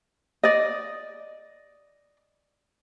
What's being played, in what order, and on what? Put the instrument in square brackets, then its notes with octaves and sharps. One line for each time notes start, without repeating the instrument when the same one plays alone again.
[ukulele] D5 D#5